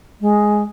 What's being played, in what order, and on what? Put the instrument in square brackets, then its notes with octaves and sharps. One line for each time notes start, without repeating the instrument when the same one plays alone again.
[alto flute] G#3